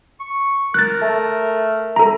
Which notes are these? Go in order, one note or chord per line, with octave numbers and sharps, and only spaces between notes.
C#6
A#4 F#6 A6
A3
A4 A#5